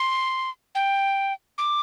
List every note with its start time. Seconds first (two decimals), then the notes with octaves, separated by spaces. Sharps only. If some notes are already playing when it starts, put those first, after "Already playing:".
Already playing: C6
0.75 G5
1.58 D6